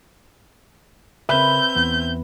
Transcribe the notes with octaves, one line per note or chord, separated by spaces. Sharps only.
C#3 C4 A#4 B4 E5 G6
E2 E3 B3